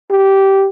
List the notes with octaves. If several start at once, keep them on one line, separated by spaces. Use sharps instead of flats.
G4